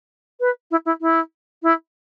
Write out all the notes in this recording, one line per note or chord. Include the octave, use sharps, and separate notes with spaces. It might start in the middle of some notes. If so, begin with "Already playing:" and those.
B4
E4
E4
E4
E4